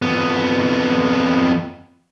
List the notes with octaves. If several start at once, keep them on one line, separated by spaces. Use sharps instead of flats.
F2 B3